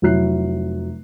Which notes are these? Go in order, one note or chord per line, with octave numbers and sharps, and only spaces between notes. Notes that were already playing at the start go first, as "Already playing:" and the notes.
F1 F#3 E4 F#6 C7